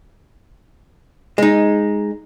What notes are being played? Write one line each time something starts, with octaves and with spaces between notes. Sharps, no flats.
G#3 D#4